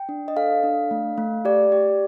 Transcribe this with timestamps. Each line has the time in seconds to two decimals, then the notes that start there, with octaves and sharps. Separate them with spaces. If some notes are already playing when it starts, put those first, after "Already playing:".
Already playing: G5
0.09 D4
0.28 D#5
0.37 A4 F5
0.63 D4
0.91 A3
1.18 A3
1.45 G4 D5
1.72 G4